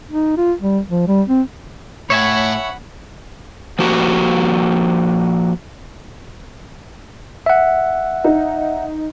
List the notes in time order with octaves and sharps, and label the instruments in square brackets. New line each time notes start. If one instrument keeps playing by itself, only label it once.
[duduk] D#4
F4
G3
F3
G3
C4
[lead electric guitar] A2 [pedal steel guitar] C#5 E5 G#5 [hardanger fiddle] F#5 B5
[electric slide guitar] F3 A#3 F#4 G4
[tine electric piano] E5 F#5
[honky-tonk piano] D#4